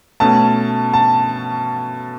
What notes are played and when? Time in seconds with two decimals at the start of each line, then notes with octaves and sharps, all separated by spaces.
0.20 B2 A3 C#4 A5
0.93 A5